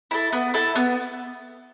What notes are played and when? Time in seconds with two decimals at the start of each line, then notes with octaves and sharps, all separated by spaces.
0.11 E4 A4
0.33 B3
0.54 E4 A4
0.75 B3